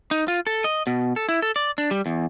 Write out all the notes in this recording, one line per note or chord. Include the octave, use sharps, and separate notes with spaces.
D#4
F4
A4
D#5
B2
A4
E4
A4
D5
D4
G3
E2